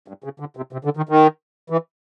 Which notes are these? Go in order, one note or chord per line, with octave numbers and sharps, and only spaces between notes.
G2
C#3
D3
C3
C3
D3
D#3
D#3
E3